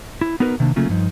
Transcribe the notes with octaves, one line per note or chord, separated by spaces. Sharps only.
E4
B3 D#4 F#4 A#4 B4
C3 D#3 A#3 D4
C#3 F#3 A3 A#3 C#4 F4
G2 F3 D#4